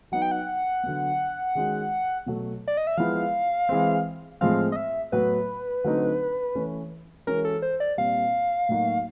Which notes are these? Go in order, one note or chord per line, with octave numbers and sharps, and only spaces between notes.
F#3 B3 D#4 F#5
G5
F#5
D3 F#3 B3
D#3 G#3 C#4 F#4
B2 F#3 A3
D5
D#5
E5
F3 G#3 B3 E4 F5
E3 G#3 C4
A2 F3 G#3 C4 F5
D#5
E5
A2 F#3 B3 B4
D3 F#3 A3 C4 D#4
E3 A3 C#4
E3 G#3 C#4 F#4 A#4
A4
C5
D5
A#2 G3 C4 F5
A2 F#3 A#3 D#4 F#4